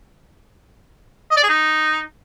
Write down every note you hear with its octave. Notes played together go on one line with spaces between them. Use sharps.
D#5
D5
G#4
D#4